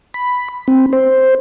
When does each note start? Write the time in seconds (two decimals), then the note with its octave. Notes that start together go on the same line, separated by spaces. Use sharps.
0.14 B5
0.68 C4
0.93 C5